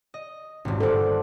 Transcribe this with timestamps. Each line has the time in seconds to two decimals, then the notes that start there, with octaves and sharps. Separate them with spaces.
0.14 D#5
0.65 D#1 G#1
0.80 G1 A4 C5 F#5 D6